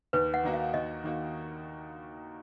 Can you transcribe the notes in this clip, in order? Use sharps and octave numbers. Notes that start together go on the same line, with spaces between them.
D#2 B4
F#5
D#3 A#3 D#4 F#4
F5
D#2 D#5
D#3 A#3 D#4 F#4